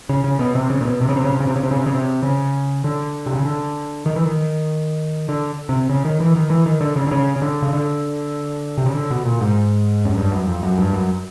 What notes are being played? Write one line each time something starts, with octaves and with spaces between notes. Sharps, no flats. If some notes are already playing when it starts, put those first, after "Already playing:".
C#3
C#3
B2
C3
C#3
A#2
B2
C3
C#3
C3
C#3
C3
C#3
C3
C#3
C3
C#3
C3
C#3
C3
C#3
D3
C3
C#3
D3
D#3
E3
D#3
D3
C3
C#3
D#3
E3
D#3
E3
D#3
D3
C#3
D3
C#3
C#3
D3
C#3
D3
C3
C#3
D3
B2
A#2
G#2
F#2
G2
F#2
F2
F#2
G2
F#2